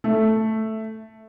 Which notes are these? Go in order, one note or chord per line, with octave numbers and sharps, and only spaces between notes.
A3